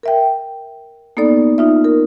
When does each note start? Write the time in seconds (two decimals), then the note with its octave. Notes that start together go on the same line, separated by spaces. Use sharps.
0.03 A#4 E5 G5
1.17 A#3 B3 D#4 A4 D5
1.58 D#4 F4 E5
1.84 A#4